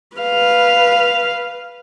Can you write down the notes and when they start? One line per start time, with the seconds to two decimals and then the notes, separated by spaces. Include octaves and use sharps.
0.17 B4 F5